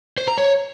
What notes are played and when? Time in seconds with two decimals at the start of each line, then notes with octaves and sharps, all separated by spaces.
0.18 C5
0.28 A#5
0.38 C#5